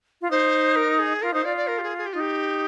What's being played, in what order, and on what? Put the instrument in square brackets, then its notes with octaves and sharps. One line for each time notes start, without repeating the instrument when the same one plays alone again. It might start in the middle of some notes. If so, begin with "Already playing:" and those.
[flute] F4
[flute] D#4 [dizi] C5
[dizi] A#4
G#4
[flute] F4 [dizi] A#4
[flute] D#4 [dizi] C5
[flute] F4 [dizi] D5
[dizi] D5
A#4
G4
G#4
G#4
G4
[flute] D#4 [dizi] F4
[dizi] G4